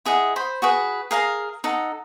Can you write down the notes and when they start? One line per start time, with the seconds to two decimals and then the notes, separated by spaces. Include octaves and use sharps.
0.05 E4 G#4 D#5 F#5
0.36 C5 B5
0.62 F#4 G#4 B4
1.11 G#4 A#4 F5 A#5
1.64 D#4 A4 F#5